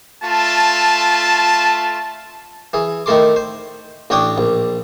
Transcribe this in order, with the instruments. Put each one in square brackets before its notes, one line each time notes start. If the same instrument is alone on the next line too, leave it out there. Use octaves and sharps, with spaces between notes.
[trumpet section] A3 F4 A5
[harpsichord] E3 G#4
D#3 A3 E4 A4 C6 D6
C5
A1 D4 C#5 G5 D6 D#6
A#1